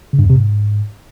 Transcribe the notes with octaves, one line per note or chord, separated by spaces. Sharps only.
C#3
G2
E2
C3
G#2